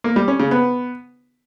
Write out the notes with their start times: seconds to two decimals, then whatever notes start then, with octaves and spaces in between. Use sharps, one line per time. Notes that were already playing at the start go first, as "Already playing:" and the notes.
0.04 A#3
0.16 G3
0.28 C#4
0.40 C#3
0.51 B3